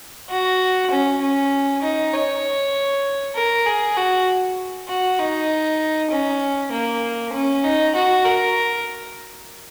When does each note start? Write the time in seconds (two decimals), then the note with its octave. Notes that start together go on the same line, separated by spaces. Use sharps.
0.30 F#4
0.91 C#4
1.21 C#4
1.83 D#4
2.13 C#5
3.36 A#4
3.66 G#4
3.97 F#4
4.89 F#4
5.19 D#4
6.11 C#4
6.72 A#3
7.33 C#4
7.64 D#4
7.95 F#4
8.25 A#4